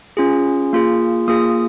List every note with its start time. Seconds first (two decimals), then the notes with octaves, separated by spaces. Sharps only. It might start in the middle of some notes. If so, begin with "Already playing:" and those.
0.17 C#4 F4 G#4
0.73 A#3 F4 G#4
1.28 A#3 F4 G#4 D#6